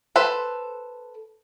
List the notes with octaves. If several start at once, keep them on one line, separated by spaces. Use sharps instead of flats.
A4 B4 C5